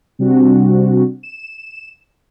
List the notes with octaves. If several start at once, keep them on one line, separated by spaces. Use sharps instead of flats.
C3 G3 C4 D4 F#4
E7